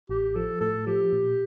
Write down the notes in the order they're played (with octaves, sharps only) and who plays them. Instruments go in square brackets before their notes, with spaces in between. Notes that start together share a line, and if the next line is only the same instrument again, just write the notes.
[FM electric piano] A1 [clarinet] G4
[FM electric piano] F3 [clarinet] A4
[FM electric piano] A2 [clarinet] A4
[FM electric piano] F3 [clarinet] G4
[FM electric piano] A#2